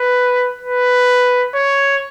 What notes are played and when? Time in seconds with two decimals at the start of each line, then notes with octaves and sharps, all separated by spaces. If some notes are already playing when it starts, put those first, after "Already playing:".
Already playing: B4
0.61 B4
1.54 C#5